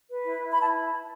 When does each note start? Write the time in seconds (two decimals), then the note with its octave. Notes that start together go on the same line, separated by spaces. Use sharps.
0.09 B4
0.25 E4
0.42 E4
0.50 B5
0.59 E4 A5